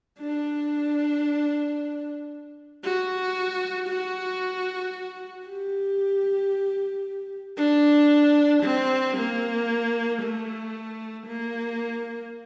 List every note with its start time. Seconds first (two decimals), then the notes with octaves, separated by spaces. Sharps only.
0.19 D4
2.83 F#4
3.88 F#4
5.47 G4
7.58 D4
8.63 C4
9.17 A#3
10.22 A3
11.28 A#3